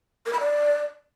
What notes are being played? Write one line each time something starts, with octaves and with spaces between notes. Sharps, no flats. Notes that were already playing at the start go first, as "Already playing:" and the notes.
A#4
B5
D5